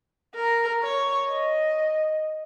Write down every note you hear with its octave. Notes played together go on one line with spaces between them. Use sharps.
A#4
C#5
D#5